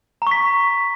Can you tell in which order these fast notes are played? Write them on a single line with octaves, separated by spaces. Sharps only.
A#5 C#6 B6